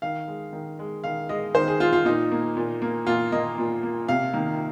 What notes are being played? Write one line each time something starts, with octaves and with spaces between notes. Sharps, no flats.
D#3 F5
G#3
D#3
G#3
D#3 F5
G#3 D#5
D#3 C5
G#4
G#3 F4
F4
A#2 D#4
A#3
A#2
A#3
A#2 F4
A#3 D#5
A#2
A#3
C3 F5
D#3 A#3